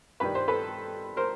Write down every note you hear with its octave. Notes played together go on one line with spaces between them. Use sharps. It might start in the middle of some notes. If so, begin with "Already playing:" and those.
G2 D#3 G3 B4
C5
A4 B4
A#4 C5